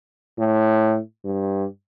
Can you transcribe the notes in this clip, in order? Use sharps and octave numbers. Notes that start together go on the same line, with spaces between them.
A2
G2